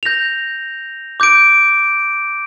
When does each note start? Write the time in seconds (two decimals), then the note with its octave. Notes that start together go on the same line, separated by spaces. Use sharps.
0.03 G6 A#6 F7
1.20 D6 G6 D7